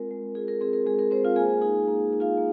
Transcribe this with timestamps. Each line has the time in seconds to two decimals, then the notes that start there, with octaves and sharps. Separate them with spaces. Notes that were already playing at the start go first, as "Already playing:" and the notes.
Already playing: G#3 C4 F4 A#4
0.11 G#3
0.35 F4 G#4
0.48 A#4
0.61 C4 G#4
0.73 A#4
0.86 G#3 G#4
0.99 A#4
1.11 G#3 C4 C5
1.25 F4 F5
1.36 A#3 G#4 G#5
1.61 D#4 G#4 G#5
1.88 A#3
2.13 D#4
2.20 F4 F5
2.37 A#3